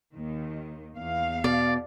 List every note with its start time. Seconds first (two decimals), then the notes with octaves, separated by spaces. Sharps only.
0.14 D#2 D#3
0.95 E2 F5
1.44 B2 D5